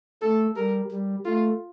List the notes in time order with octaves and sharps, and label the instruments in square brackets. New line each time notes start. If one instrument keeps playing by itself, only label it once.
[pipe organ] A3 [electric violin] A4
[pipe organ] G3 [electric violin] A#4
[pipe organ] G3
[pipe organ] A3 [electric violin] F4